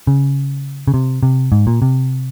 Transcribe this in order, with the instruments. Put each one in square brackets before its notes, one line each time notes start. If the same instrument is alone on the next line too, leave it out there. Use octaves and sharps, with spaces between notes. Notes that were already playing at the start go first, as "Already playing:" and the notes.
[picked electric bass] C#3
C#3
C3
C3
G#2
A#2
C3